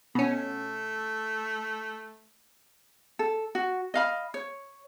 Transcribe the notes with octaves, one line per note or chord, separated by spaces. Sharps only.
B2 A3 C#4
A4
F#4
D#5 F5 B5
C#5